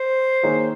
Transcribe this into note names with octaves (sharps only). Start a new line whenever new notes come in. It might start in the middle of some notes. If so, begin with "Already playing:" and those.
Already playing: C5
D#3 A#3 D#4 G#4 C#5